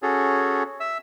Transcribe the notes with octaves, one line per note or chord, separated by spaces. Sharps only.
C#4 F#4 G#4 A4 C#5
E5 E6